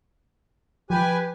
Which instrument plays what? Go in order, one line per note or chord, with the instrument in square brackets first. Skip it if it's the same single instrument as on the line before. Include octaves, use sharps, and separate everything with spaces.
[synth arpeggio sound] F3 [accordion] G4 B4 G#5